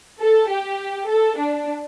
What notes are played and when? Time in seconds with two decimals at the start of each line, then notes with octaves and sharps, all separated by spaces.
0.21 A4
0.51 G4
1.09 A4
1.38 D4